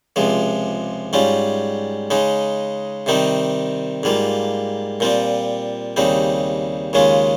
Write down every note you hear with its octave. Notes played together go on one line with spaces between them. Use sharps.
C#2 C3 F3 G#3
G#2 G3 C#4 F4
C#3 G#3 D#4
C3 D#3 G3 C4 D#4
G#2 G3 A#3 F4
A#2 G3 C4 F4
D#2 C#3 G3 C4 D#4
D#2 C#3 G#3 C#4 F4